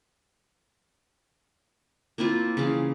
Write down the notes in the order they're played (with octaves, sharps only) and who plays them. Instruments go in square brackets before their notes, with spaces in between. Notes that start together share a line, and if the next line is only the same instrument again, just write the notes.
[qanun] A#3 C4 E4 F4
C#3 E3 G#4 F5